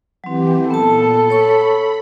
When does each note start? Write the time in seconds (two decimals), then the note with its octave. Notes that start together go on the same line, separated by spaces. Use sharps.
0.24 E3 F#3 C4 G4
0.71 A#2 B3 A4 A5
1.30 C#5 B5 C#6